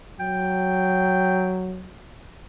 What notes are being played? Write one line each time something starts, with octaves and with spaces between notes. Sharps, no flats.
F#3 G5